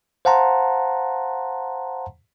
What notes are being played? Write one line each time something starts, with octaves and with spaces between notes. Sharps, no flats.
C5 F5 F#5 A5 A#5 C6